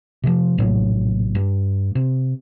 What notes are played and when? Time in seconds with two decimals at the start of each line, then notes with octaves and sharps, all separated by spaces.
0.24 C3 D#3 F3
0.58 A#1 A2 C3 F#3
1.35 G2
1.95 C3